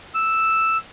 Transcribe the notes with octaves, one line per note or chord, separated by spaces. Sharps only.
E6